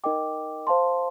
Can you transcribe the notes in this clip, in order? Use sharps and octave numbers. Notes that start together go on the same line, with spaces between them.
D#4 A#4 D#5 G5 D6
C5 F5 A5 C6